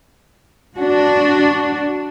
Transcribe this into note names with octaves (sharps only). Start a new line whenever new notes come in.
D4 F#4